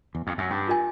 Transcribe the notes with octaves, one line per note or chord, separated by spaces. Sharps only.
E2
F2
F#2
G2 C#4
F4 A#4 D#5 G#5